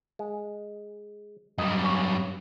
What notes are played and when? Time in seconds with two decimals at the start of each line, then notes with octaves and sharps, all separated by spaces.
0.19 G#3
1.58 F#2 G3 D#5
1.84 C#4 C#5